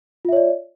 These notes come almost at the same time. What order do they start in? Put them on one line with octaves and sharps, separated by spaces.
F4 E5 C#5 D5